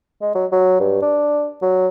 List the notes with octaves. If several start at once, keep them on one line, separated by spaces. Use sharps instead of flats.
G#3
F#3
F#3
G2
D4
F#3